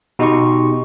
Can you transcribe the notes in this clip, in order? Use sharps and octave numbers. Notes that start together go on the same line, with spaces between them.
B2 D#4 G4 D#5 C6 C#6